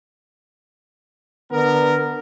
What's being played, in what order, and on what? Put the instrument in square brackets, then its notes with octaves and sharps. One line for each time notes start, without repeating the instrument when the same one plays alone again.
[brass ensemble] D3 B3 A#4